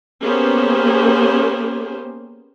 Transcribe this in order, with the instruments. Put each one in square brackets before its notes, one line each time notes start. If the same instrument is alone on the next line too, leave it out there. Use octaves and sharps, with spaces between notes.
[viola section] A#3 B3 C#4 G4 G#4 C5